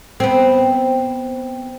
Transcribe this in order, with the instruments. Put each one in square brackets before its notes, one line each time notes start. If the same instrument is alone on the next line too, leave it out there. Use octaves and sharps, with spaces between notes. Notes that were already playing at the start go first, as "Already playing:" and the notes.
[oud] B3 C4